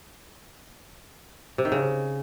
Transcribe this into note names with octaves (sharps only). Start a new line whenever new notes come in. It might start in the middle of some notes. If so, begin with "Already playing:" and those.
C3
D#3
C#3